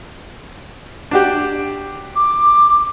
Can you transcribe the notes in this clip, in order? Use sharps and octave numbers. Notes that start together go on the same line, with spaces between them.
D4 F#4 G4
D6